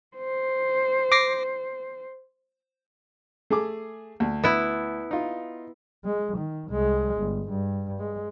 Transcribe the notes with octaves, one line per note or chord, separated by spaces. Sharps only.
C5
D6 A#6 C7
A3 G#4 D6
D2
B3 E4
D#4 F4
G#3
D#3
C2 G#3
G1
G2
G#3